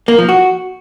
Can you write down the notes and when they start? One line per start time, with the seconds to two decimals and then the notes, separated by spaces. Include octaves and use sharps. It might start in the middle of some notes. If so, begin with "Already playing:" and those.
0.08 A#3
0.18 F3
0.29 F#4